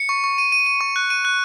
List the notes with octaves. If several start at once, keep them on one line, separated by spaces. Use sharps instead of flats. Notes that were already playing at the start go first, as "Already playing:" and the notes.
Already playing: C#7
C#6
C#6
D#7
D#7
D#7
C#6
F#6
D#7
F#6